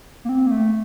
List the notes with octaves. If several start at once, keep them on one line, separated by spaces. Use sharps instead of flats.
A#3
C4
A#3
A3